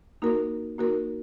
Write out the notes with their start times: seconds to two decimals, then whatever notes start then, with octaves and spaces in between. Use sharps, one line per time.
0.22 A#3 D#4 F#4 A#4
0.78 A#3 D#4 F#4 A#4